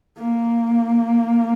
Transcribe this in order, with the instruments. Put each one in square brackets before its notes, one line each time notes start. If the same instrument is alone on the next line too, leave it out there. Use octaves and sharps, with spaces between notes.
[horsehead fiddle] A#3